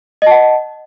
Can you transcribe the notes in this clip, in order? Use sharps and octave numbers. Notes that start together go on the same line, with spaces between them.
D#5 F#5 A5